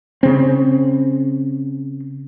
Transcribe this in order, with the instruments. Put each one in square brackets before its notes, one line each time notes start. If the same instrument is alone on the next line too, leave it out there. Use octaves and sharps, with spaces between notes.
[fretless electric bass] C#3 C4